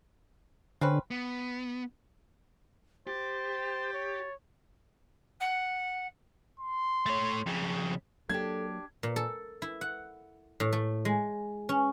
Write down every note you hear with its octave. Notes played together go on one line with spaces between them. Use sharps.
D3 C4 C#4 B4
B3
G4 C5 A6
C#5
F#5
C6
A3 C#5
F2 C#3
F#3 A#3 D4 G4 A4 G#6
A#2
A4
E4
F#5
A2
A3
G#3
C#4